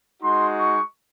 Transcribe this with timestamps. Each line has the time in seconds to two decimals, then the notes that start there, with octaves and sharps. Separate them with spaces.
0.21 G#3 D#4 F#4 C6
0.57 C#6